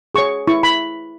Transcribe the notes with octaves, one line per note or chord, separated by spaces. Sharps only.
G#4 C#5 C#6
E4 C#6
B5